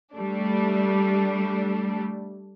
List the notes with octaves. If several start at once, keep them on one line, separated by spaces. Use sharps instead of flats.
G3 A3 D4